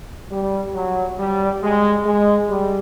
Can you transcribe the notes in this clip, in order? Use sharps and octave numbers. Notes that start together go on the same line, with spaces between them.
G3
F#3
G3
G#3
G#3
G3